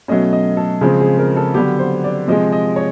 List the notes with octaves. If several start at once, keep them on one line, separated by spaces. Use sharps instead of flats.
B2 F#3 A3 C#4 D#5
D#5
A4
C#3 F3 G#3 C4 G#4
G#4
A#4
A4
D3 F#3 B3 G4
C5
D5
C3 F3 G#3 D#5
D#5
C#5